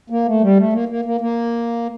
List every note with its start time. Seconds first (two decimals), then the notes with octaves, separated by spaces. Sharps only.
0.10 A#3
0.26 A3
0.41 G3
0.57 A3
0.73 A#3
0.89 A#3
1.05 A#3
1.21 A#3